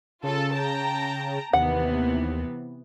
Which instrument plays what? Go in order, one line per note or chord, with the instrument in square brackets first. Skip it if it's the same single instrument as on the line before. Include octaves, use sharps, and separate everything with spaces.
[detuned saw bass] C#3 [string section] F4 A4
[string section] G5 A5 A#5
[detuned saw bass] D#2 [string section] C3 E3 B3 [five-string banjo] F#5